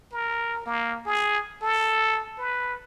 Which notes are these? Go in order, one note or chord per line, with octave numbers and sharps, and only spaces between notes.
A#4
A#3
G#4
A4
B4